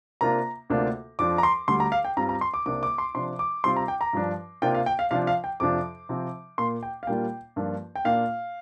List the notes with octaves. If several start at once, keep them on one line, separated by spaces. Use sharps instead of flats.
C3 A#3 D4 F4 A#5
D2 C3 A#3 D4 F4
F2 F3 D4 F4 D6
A#5
C6
D2 D3 G3 C6
A#5
F5
G5
G2 G3 C4 F4 A#5
A#5
C6
D6
C2 C3 A#3 D4 D6
D6
C6
C3 F3 D4 C6
D6
C3 G3 C4 F4 C6
A#5
G5
A#5
G2 F3 D4
C3 A#3 D4 F4 G5
F5
G5
F5
C3 F3 D4 F4 F5
F5
G5
F2 C3 F3 D4 F4 D6
C3 F3 C4
A#2 A#3 F4 C6
G5
F5
A#2 G3 A#3 D4 F4 G5
G2 F3 A#3 D4 F4
G5
A#2 A#3 D4 F4 F5